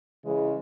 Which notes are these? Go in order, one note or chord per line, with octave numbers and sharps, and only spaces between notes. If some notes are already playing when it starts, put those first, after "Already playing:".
C#3 E3 G#3